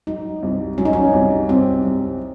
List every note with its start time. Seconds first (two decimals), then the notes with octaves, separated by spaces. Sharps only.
0.07 F#3 D#4
0.43 C2
0.78 F#3 C#4
0.85 D#4
0.93 C#4
1.13 C2
1.49 C2 C4
1.85 C2